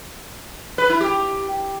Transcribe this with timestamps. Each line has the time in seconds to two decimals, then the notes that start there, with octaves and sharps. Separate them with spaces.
0.78 B4
0.89 E4
1.01 G4